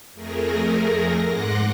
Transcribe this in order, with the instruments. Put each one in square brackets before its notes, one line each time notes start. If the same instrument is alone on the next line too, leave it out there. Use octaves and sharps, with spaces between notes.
[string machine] F2 A3 G#4 A#4 A#6
G#2 F#5 C6 D6 F#6 A#6